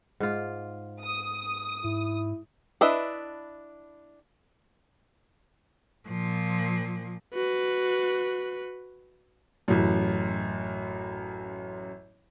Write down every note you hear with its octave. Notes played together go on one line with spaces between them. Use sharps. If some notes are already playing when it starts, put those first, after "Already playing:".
G#2 F4
D#6
G#2 E4
D4 E4 B4 D#5 E5
A#2 F3
F#4 B4
A1 F#2